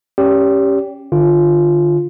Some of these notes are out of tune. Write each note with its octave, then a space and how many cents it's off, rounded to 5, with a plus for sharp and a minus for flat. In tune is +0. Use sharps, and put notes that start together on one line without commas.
C#4 -5 G4 +0 D5 -45
D3 +30 F4 +0